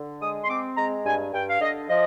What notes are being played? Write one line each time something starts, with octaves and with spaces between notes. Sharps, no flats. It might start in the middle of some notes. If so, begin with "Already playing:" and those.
Already playing: D3
G#3 D#6
C6
C4 D6
G#3 A#5
G2 G#5
G2 G5
F5
D3 D#5
F3 D#5